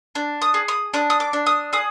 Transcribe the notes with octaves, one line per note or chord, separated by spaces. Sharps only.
D4
D#6
G#4
D#6
D4 D#6
D#6
D6
D4
D#6
G#4 D#6